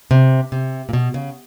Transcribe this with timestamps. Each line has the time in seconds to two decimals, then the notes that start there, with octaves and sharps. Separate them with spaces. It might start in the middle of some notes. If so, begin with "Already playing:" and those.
0.11 C3
0.52 C3
0.89 A#2
0.93 B2
1.14 C#3